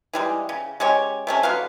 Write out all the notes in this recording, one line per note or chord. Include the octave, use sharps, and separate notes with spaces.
E3 G3 G#3
C#3
G#3 C#4 G4 C#5
C3 A3 C#4
D3 F#3 B4 F5